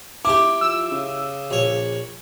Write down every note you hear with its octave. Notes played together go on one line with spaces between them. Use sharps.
F1 E4 G4 D6
F3 E6
C#3
A#1 C#5